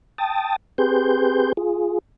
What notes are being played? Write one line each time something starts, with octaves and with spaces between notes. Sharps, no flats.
G5 A5 D#6 A6
C4 G4 G#4 B4 C6 G6
F4 G#4